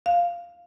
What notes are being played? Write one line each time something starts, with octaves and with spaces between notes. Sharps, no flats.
F5